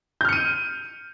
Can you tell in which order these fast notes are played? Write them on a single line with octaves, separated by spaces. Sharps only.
G6 F6 C#7 D#7